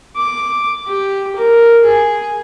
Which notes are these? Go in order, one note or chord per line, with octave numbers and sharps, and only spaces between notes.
D6
G4
A#4
G#4